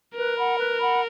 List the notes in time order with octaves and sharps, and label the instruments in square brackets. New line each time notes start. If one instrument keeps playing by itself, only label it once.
[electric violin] A#4 [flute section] B4
[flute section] F#5 B5
B4
F#5 B5